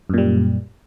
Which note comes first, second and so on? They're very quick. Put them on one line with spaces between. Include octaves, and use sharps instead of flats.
F#2 A#2 G3